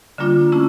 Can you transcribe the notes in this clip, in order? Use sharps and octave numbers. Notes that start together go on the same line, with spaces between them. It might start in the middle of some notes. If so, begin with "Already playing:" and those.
D3 G3 A#3 D4 F4
A3 C#4 E4